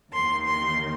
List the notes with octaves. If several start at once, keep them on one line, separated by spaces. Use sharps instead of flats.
D#2 D#3 A#3 C6
C6